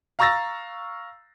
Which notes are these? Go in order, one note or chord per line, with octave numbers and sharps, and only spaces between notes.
F5 A#5 C#6 E6 A6 A#6